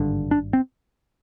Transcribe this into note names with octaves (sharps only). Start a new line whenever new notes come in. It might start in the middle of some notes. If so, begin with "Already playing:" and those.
Already playing: G#1 G2 D3
D4
C4